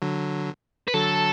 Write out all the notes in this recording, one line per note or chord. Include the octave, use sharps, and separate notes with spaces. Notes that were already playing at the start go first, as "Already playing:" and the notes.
D3 F#3
B4
D3 F#3 A4